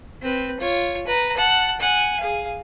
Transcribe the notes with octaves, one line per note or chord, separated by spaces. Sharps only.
C4 B4
F4 C#5
B4 A#5
F#5 A5
F#5 G#5
G#4 F5